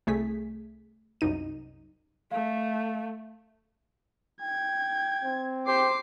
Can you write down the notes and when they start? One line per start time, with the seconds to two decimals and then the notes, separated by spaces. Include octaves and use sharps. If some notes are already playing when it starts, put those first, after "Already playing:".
0.07 C2 A3 G#4 B6
1.21 C2 F#2 D#4 D#7
2.31 A3 F5
4.41 G5 G#6
5.23 C4
5.67 G4 C5 D6 C7